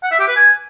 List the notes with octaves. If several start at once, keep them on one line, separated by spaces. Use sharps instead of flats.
F#5
E5
G4
B4
G#5